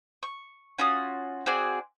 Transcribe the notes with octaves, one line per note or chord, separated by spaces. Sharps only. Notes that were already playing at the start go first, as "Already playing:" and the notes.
C#6
C#4 F4 F#4 D#6
C4 F#4 G#4 D5